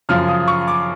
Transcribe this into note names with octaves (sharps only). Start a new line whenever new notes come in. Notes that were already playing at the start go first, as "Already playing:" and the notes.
F#2 C#3 F3 F6
D#6
C#6
D6